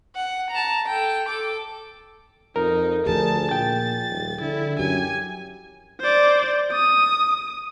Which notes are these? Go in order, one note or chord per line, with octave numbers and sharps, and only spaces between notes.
F#5
A5 A#5
A4 G5
A4 D6
F2 D#4 A#4
D2 F3 G#4 A5
A#2 G5 A6
D#1
D3 E4
F#2 G4 G#5
C5 D5
D#6